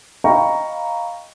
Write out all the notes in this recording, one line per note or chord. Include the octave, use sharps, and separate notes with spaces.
D#5 F5 G5 A#5 B5 C#6